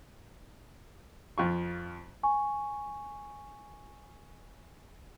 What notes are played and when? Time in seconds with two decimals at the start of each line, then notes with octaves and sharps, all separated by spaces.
1.38 F2 F4 C#6
2.23 G#5 C#6